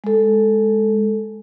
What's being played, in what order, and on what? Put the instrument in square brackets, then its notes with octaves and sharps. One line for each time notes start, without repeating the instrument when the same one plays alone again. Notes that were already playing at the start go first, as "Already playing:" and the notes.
[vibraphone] G#3 A4